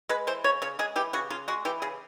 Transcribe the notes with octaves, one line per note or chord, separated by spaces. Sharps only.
G#3 B4
E3 C5
C#3 C#5
C#3 C#5
G#3 G#4
E3 G4
C#3 F#4
C#3 F4
G#3 F#4
E3 G4
C#3 G#4